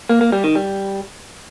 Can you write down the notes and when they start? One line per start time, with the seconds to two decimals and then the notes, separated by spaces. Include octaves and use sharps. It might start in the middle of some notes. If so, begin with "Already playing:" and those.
0.09 A#3
0.21 A#3
0.32 G3
0.44 D#3
0.55 G3